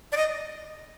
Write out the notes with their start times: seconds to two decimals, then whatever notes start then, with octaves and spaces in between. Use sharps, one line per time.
0.12 D5
0.17 D#5